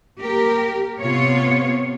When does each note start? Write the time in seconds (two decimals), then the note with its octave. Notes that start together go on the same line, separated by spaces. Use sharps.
0.20 A#3 G4 A#4
1.01 C3 B3 F4 C#5